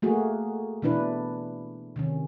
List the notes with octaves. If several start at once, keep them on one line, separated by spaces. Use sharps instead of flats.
A3 A#3 F#4 G#4
B2 E3 D4 E4 B4
C3 D#3 C#4